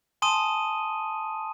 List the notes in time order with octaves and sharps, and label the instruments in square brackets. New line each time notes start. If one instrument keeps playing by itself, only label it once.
[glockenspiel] G#5 A5 C6 D#6 D#7